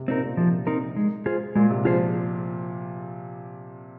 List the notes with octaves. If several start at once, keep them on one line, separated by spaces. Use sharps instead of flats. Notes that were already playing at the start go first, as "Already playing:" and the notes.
Already playing: C3
A#2 C4 D#4 A#4
A#2
C3 F3
C4 D#4 A#4
G#3
F4 G#4 C5
A#2 G#3
C3
F3 F4 G#4 C5